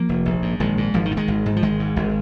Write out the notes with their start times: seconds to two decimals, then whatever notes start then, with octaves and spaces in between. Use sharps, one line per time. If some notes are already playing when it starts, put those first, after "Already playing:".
Already playing: F3 A#3
0.09 F1
0.26 A#1
0.42 G#2
0.60 A#1 D#3 G#3
0.78 G#2
0.94 G#1 F3
1.05 D#3
1.11 G#2
1.17 D#3 G#3
1.28 G#1
1.46 G#2
1.56 F3
1.62 G#1 D#3 G#3
1.80 G#2
1.96 G#1